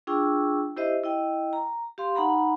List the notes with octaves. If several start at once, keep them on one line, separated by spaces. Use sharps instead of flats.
D4 F4 G#4 G5 C#6 E6
E4 G4 C5 D#5 E5
E4 D#5 G5
A#5
G4 F5 C6
D#4 F#5 A#5 B5